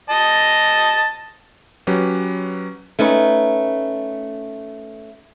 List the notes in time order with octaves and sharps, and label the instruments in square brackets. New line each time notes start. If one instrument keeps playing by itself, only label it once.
[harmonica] D#5 A5
[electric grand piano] F#3 C#4 G4 B4
[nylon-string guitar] A3 C#4 D#4 B4